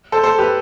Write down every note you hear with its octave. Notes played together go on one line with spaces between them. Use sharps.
A4 C5
A4 C5
G4 B4